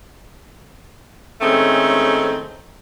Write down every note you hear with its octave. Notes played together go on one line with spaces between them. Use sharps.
A2 D#3 G#3 A3 C4 C#4